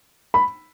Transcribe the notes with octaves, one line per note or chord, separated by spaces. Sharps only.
B5